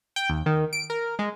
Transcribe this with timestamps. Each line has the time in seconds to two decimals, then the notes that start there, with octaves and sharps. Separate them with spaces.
0.16 G5
0.30 D#2
0.46 D#3
0.73 D7
0.90 A#4
1.19 G#3